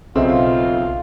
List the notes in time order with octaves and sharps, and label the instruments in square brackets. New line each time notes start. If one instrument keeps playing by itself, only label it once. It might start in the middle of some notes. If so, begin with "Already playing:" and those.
[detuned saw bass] B1 [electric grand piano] C#3 C4 [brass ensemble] F4 [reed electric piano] A4 D#5 E5